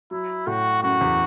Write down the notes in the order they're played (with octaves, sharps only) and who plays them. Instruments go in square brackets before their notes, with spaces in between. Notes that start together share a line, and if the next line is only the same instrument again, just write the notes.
[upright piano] F#3 [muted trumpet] E4
[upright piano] A2 [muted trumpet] F#4
[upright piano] F#2 [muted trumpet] F#4
[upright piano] E2